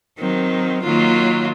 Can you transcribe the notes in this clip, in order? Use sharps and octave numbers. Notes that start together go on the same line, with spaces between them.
D#3 F#3 C4
D#3 F#3 A#3 F4